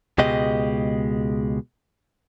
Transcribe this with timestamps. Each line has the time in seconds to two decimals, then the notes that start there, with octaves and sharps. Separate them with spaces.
0.18 C#2 B2 G#3 G4 D#5